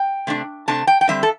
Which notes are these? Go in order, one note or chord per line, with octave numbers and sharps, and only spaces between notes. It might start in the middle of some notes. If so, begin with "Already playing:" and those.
Already playing: G5
C3 A3 D4
C3 A3 D4 A5
G5
G5
D3 G3 C4 E5
A4